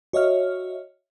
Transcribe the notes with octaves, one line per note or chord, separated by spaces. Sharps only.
F#4 C#5 D#5 E5 F6